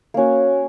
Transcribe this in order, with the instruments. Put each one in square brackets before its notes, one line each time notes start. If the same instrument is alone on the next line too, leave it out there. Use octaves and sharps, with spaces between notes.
[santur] A#3 C#4 F#4